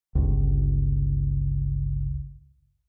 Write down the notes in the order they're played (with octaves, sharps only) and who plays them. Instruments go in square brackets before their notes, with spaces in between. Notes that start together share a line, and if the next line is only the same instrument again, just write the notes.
[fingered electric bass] G1 C#2